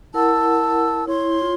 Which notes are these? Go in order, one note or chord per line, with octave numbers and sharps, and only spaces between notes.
E4 A#4 F#5 A5 E6
E4 C#5 C6
F4